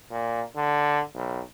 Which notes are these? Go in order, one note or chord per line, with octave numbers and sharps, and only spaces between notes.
A#2
D3
B1